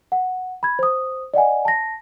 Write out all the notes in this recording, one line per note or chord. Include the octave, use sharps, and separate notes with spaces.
F#5
B5 G#6
C5 D#6
D5 D#5 F#5 G#5
A5 A#6